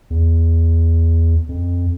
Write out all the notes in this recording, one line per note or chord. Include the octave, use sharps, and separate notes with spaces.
E2
F2